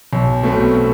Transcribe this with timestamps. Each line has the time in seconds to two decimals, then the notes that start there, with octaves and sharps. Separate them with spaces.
0.13 B1
0.43 B2 A3 C4